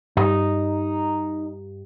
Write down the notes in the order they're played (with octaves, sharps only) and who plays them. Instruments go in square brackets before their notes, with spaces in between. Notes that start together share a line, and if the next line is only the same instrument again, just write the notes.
[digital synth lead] G2 [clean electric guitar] D#4